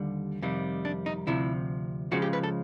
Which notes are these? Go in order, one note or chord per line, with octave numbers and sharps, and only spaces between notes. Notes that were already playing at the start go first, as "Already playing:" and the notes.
Already playing: D#2 D3 G3
F2 C3 D#3 G3
D4
D#4
D2 C3 F3 E4
C#2 C#3 F3 F#4
G4
B4
A4